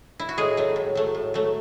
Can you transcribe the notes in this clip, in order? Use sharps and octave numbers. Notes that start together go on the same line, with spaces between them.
E4
F#4
A2 G#3 G#4
F#3 A3
A2
F#3 A3
A2
F#3 A3